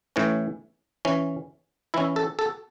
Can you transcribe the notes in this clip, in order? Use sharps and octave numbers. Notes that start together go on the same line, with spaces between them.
A2 E3 C#4
E3 C#4
E3 C#4 E4
A4
A4